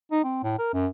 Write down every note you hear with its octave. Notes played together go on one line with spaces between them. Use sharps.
D#4
C4
A2
A#4
F#2